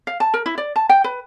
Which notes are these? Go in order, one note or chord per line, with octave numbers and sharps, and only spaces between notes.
F5
A5
A#4
E4
D5
A5
G5
B4